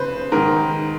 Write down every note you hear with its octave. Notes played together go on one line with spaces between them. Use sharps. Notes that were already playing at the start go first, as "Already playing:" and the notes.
Already playing: C#3 B4 C5
G#2 D#3 A#4